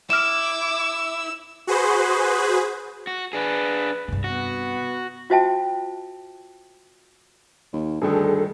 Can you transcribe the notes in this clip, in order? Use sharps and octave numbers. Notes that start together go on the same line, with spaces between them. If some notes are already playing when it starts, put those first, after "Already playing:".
E4 D6 E6 F6 E7
F#4 G#4 B4 C5
F#4
D4 G#4 B4
G2 C3
B3 F#4
F4 F#4 C5 E5 G5 A5
D#2
D2 G2 D3 D#3 G#4 A4